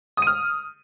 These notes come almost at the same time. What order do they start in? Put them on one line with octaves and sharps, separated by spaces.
D#6 D#7 F6